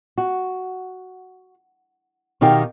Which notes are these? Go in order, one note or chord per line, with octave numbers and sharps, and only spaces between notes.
F#4
B2 D#3 D#4 G4 F5 G5